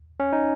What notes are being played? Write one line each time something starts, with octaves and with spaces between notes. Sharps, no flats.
C#4
D#4